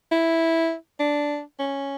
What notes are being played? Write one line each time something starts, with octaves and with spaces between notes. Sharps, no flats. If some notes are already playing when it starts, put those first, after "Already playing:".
E4
D4
C#4